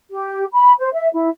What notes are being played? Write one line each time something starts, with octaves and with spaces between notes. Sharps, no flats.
G4
B5
C5
E5
E4